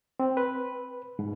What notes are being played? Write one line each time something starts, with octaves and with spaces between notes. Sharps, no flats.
C4
B4
G#2